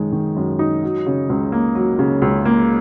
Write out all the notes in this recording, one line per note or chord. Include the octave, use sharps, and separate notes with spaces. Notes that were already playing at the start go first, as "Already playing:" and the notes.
Already playing: F#2 D#3 G#3 D#4
D#3
F#2
D#4
F#3
C#3
C#2
A#3
F#3
C#3
C#2
A#3